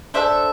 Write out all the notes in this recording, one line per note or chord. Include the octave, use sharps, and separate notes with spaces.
D4 A4 C5 E5